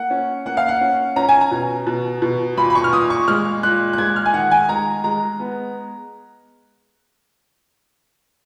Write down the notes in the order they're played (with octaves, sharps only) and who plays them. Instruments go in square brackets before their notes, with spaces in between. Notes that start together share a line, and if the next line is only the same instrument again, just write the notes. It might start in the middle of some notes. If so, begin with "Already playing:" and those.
Already playing: [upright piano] A#3 F#5
C#4
A#3 F#5
F5
F#5
C#4
C#4 A#5
G#5
A#5
B2
B2
B2
A#2 B5
B5
C#6
F6
A#2 D#6
C#6
G#3 F6
A#2 F#6
F#6
G#3 G#6
F6
G#5
D#3 F#5
G#5
G#3 A#5
G#3 A#5
B3